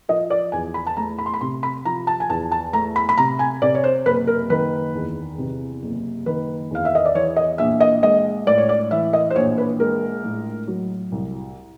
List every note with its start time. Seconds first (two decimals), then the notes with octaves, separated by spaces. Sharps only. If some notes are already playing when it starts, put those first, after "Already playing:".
0.09 F3 D#5
0.30 D5
0.52 E2 G#5
0.74 B5
0.87 A5
0.97 A3 A#5
1.19 B5
1.26 C6
1.34 B5
1.41 C3 C6
1.63 B5
1.85 F3 A#5
2.07 A5
2.20 G#5
2.29 E2 A5
2.52 A5
2.73 A3 A#5
2.96 B5
3.09 B5
3.18 C3 A#5
3.39 G#5
3.62 C3 D5
3.75 C#5
3.84 C5
4.06 F#1 B4
4.27 A#4
4.50 D#3 B4
4.94 E2
5.38 C3
5.82 F#1
6.26 D#3 B4
6.71 E2 F5
6.85 E5
6.95 D#5
7.05 D5
7.15 E3 C#5
7.36 D#5
7.58 A#1 E5
7.80 D#5
8.03 G#3 D#5
8.47 A2 D5
8.58 C#5
8.69 D5
8.91 E3 E5
9.13 D#5
9.30 C5
9.35 A#1 C#5
9.58 B4
9.79 G#3 A#4
10.24 A2
10.67 F#3
11.12 C2